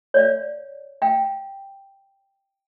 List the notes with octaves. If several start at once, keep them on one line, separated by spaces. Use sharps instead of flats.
C#5 D5 F5
F5 G5